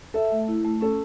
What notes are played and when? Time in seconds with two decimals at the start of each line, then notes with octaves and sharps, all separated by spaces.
0.14 A4 E5
0.32 A3
0.48 E4
0.65 A3
0.81 C#4 A4